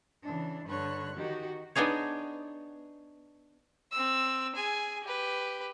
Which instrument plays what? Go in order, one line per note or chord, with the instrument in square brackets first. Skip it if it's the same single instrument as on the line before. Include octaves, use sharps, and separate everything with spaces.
[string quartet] C#3 E3 D4
G2 D3 B4 C#5 C#6 F#6
D#3 D#4 F#4 G4
[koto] B3 D4 D#4 G#4 C#5
[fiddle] C4 E6
G#4 G#5
G4 B4